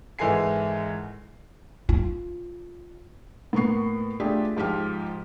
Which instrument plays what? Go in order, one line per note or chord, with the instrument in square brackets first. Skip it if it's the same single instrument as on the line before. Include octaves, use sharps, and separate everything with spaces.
[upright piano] G#1 E3 G#3 A4 G#5 C7
[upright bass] F4
[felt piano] A2 A#3 B3 C#6 C7
A3 D4 F4 G4 G#4
G#2 F3 F4 G4 F6